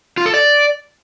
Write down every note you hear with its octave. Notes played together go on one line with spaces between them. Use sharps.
F4
A4
D5